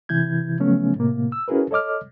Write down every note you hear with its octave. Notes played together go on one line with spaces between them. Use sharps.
C3 E3 E4 G6 G#6
C#3 F3 F#3 A3 B3 C#4
A2 C3 A#3
E6
C#4 E4 F#4 G#4 A#4 B4
A4 C#5 D#5 D6 F6